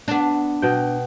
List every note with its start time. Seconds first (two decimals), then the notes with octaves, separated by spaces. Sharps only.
0.08 B3 D4
0.62 B2 G5